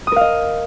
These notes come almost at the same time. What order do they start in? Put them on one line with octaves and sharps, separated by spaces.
D#6 A#4 F5 D#5